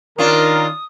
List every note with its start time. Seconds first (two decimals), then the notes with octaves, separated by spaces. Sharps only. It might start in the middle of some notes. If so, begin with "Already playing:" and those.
0.18 D#3 C#4 D4 F4 A#4 D#6